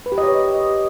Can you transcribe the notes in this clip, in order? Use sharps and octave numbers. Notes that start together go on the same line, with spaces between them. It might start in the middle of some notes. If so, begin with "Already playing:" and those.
B4
G4
D#5
C#5